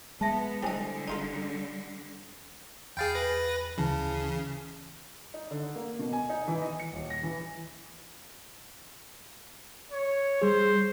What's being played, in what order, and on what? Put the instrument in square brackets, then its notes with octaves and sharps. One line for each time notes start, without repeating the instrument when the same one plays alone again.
[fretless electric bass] G#3 [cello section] B3 [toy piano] E5 A5
[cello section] D3 G3 [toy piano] E4 C5 G#5 [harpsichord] G4 D#5
[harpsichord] D#4 F4 A4
[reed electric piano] E2 B5 A6 [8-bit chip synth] G#4 F5 G5
[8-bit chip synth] B4 A#6
[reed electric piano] D2 E3 A5 [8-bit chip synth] C#3
[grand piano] D#4
D3
A#3
B2
G#5
D#4
E3
D#5
C#7
D#1
A#6
E3
[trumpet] C#5
[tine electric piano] G3 G#4 [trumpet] C5